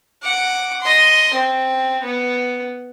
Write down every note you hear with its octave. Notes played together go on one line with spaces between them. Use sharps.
F#5 D6
D#5 C6
C4
B3